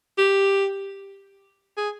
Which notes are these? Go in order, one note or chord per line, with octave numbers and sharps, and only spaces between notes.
G4
G#4